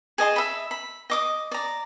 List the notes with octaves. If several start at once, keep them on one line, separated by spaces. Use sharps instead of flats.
G#4 D#5 A5 C6
E5 B5
B5
D#5 D6 D#6
D5 A#5